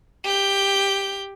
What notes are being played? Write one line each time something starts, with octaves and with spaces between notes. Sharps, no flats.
G4 G6